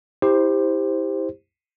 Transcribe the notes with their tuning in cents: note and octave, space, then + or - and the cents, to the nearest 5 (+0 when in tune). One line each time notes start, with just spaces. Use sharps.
E4 -25 G4 +15 C5 +0